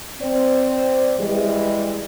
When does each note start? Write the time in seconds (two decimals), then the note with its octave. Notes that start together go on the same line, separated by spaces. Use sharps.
0.21 C4 D5
1.19 E3 G3 G#3